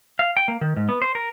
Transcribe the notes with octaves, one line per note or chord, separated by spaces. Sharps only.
F5
G5
A#3
D#3
G#2
B3
C5
A#4